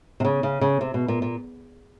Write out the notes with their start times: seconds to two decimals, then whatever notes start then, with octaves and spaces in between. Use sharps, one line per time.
0.20 C3
0.25 C#3
0.43 C#3
0.61 C#3
0.81 C3
0.94 B2
1.08 A#2
1.22 A#2